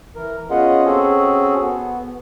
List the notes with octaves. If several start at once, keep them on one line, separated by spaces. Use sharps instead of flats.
E3 A#4
B3 C#4 F4 G#4 D#5 F#5
C4 C#4 F#4 G#4 A4
B3